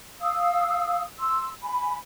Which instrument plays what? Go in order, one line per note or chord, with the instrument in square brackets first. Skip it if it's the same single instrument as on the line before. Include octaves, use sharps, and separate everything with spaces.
[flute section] F5 D#6 E6
C6 E6
G#5 B5